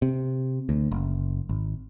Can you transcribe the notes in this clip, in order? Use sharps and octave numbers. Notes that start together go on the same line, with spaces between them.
C3
D2
F#1
G#1